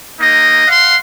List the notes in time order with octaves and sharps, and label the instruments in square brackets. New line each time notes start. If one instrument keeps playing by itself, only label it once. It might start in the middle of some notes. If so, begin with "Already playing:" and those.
[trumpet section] A#3 D#4 D#5
F5 F#5 C6